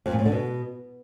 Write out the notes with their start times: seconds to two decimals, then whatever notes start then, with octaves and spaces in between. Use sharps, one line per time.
0.06 F2
0.12 A#2
0.19 A2
0.25 D3
0.32 B2